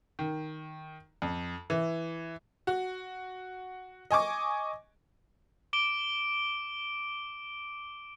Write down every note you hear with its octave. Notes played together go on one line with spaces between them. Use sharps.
D#3
F2
E3
F#4
D#5 G#5 C#6 D6
D6 D7 G7